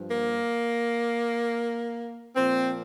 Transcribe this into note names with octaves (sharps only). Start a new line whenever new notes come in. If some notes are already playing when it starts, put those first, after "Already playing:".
Already playing: G2 F3
A#3
A#2 F3 C4